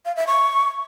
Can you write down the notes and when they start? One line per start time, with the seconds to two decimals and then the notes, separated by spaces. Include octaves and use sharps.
0.05 F5
0.16 E5
0.27 C#6